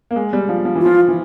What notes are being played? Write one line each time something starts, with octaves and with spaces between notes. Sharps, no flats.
A#3
G#3
G3
F3
F3
E3
F3 F4
E3